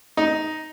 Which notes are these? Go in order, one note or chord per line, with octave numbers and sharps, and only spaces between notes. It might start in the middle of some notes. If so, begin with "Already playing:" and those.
D#4